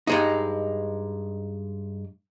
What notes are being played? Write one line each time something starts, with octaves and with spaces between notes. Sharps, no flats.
G2 G#3 D#4